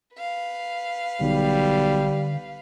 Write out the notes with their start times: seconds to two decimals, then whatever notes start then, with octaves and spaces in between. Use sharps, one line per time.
0.16 B4 F5
1.21 B1 D3 G3